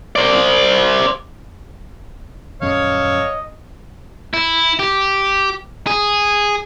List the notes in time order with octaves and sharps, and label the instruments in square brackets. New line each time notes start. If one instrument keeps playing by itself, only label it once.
[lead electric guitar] C5 D5
[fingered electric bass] D#1 F#2 C#4 [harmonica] A4 F5 [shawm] C#5 [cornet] D#5
[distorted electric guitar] E4
G4
G#4